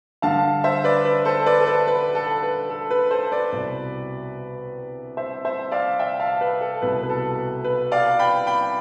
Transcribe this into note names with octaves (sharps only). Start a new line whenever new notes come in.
G2 D3 F5 A5
C5 E5
B4 D5
B4
A4 C5
B4 D5
A4
B4
B4
A4
B4
A4
B4
A4 C5
B4 D5
C2 B2
C5 E5
C5 E5
D5 F5
E5 G5
F5 A5
B4
A4
C2 B2 B4
B4
A4
B4
D5 F5
G5 B5
G5 B5